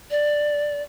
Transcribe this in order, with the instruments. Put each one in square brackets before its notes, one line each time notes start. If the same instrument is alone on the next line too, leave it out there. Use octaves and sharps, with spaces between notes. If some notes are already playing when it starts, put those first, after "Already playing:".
[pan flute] D5